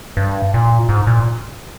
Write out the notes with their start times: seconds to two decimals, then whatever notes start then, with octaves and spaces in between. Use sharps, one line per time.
0.17 G2
0.54 A#2
0.89 G#2
1.07 A#2